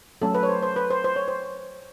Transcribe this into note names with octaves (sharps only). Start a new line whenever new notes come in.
F#3 A3 C#4 A4
B4
C#5
C5
C5
B4
C5
C5
C#5
C5